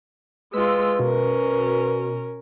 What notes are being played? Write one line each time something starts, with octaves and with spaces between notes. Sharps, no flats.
G#3 F4 B4 E6
B2 C#4 A#4